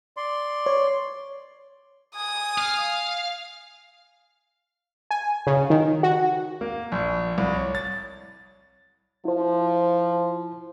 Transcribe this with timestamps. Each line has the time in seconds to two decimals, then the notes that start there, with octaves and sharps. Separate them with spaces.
0.17 D5 C6
0.66 C#5
2.15 G#5 D#6
2.58 F5
5.11 G#5
5.47 C#3
5.70 D#3
6.03 F#4
6.61 A#3
6.92 A#1
7.38 C2
7.53 C#5
7.75 A6
9.25 F3 E4 C5